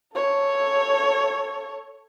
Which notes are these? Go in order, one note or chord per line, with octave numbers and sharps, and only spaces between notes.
A4 C#5